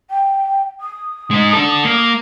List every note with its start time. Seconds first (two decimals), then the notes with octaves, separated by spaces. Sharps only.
0.11 G5
0.80 D#6
1.31 G#3 D#4
1.53 D4 A4
1.85 A#3